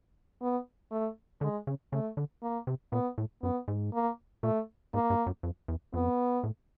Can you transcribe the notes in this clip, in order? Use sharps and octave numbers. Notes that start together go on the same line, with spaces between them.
B3
A3
D3 G#3
C#3
C#3 A3
D3
A#3
C3
A#2 B3
A2
F#2 B3
G#2
A#3
A#2 A3
G#2 A#3
G2
F#2
F2
E2
F2 B3
A2